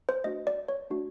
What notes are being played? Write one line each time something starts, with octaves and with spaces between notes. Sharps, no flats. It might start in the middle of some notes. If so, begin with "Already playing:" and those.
C5
A3 D4 F#4 D#5
D5
C#5
A3 D4 F#4